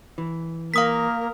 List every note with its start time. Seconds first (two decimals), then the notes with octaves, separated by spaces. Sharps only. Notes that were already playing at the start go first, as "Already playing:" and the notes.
0.18 E3
0.74 A#3 A#4 F5 D#6 B6